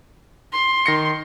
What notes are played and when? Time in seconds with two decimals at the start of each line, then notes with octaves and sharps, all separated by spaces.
0.53 C6
0.86 D#3 A#6 C#7